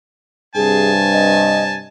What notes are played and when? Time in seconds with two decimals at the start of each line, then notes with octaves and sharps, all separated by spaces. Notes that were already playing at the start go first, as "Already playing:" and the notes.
0.55 G2 C3 G#4 G#5 A5
1.13 D#5